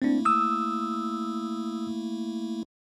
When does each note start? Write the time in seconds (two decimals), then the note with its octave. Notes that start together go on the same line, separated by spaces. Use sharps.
0.02 A3 A#3 C4 D4 E4
0.25 D#6 E6